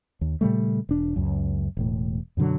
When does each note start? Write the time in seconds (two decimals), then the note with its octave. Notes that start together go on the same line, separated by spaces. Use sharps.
0.21 D#2
0.41 A#2 C#3 G3 A3
0.89 E1 D4
1.16 C#2 F#2
1.77 E1 A2
2.37 F#2 B2 D3 F#3